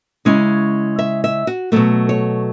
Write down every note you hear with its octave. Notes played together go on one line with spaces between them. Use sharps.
C#3 G#3 C#4 E4
E5
E5
F#4
B2 F#3 A3 A4
C#5